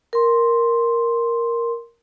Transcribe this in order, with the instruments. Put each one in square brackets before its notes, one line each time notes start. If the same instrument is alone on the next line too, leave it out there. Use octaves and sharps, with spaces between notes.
[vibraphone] A#4 C6